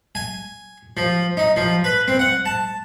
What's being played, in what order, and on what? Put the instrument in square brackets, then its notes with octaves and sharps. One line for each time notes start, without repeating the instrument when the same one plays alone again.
[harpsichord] G#5
F3
D#4
F3
B4
C4
F#5
A5